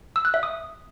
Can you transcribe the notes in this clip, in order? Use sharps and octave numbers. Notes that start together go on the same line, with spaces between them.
E6
F#6
E5
D#6